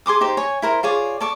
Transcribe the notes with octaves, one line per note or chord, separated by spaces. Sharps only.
G#4 C6 D6 D#6
D#4 G4 C5
C#5 G#5
E4 A#4 C5
F4 G#4 C#5 D5
A4 D5 C#6